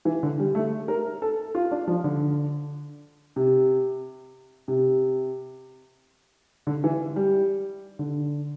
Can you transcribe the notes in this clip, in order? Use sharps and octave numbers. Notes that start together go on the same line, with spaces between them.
E3
D3
G3
A3
A#4
A4
F4
D4
F3
D3
C3
C3
D3
E3
G3
D3